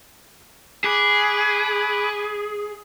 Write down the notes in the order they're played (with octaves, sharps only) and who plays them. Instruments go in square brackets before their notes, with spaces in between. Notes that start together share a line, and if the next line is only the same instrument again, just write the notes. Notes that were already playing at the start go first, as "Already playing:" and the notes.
[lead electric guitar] G#4 [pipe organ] B5 D6 F#6